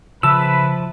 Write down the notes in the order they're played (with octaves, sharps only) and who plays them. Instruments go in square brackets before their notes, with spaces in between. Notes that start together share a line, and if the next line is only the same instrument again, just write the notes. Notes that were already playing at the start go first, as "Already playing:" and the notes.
[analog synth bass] C#3 [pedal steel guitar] F3 A5 [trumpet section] B4 E5 B5 [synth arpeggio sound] E6